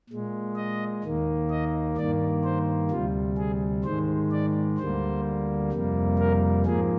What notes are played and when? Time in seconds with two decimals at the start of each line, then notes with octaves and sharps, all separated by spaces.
0.09 A#2 G#3
0.56 D#5
1.03 D#2 D#3 A#3
1.50 D#5
1.97 G2 D#3 A#3 D5
2.44 C5
2.91 D2 C3 G3 F4
3.37 G#4
3.84 G#2 D#3 G#3 C5
4.32 D5
4.78 D2 D3 G3 A#3 C5
5.72 F2 C3 G3 A#3
6.18 A#4
6.66 G#2 F3 A#3 G#4